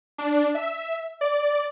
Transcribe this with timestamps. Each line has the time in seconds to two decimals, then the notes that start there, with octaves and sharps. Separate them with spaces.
0.18 D4
0.55 E5
1.21 D5